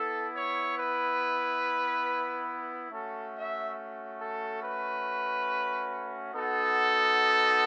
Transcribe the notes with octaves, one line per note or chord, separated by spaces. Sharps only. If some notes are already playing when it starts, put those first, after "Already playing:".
Already playing: B3 E4 A4
C#5
B4
A3 C#4 F#4 A4
E5
A4
B4
B3 D#4 F#4 A4